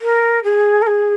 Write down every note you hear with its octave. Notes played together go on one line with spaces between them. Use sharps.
A#4
G#4
A#4
G#4